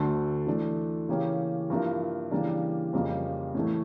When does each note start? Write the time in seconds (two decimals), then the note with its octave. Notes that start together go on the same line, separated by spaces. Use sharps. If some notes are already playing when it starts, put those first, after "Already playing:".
Already playing: D2 D3 A3 D4 A4
0.47 E3 A3 D4
1.09 C#3 E3 A#3 C#4 G4
1.70 G2 F3 A#3 E4 A#4
2.31 C#3 E3 G3 A#3 D4
2.93 F2 C#3 G3 A#3
3.55 A2 E3 A3